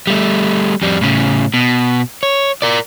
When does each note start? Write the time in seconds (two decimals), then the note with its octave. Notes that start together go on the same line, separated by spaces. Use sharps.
0.07 G3 A3
0.82 F2 G3
1.01 A2 C#3
1.54 B2
2.23 C#5
2.62 A#4 D5